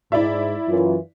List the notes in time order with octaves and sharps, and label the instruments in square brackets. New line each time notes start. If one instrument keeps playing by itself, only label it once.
[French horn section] G#2 [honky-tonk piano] E4 D5 E5
[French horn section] F#2 E3 F4